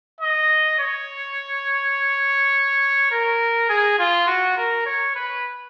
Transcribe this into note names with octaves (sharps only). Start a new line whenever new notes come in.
D#5
C#5
A#4
G#4
F4
F#4
A#4
C#5
B4